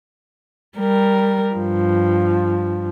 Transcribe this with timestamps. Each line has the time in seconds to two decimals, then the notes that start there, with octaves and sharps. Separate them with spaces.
0.78 G3 A#4
1.56 G2 F3